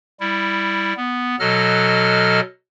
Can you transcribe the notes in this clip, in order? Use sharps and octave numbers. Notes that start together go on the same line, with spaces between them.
G3 E4
B3
B2 F#3 A4 D#5 F6